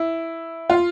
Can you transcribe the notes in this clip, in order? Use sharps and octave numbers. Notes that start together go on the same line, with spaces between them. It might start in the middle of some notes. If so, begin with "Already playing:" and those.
Already playing: E4
F4